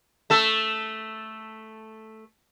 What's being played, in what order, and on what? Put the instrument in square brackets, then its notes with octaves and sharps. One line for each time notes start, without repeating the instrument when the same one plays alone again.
[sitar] A3 A4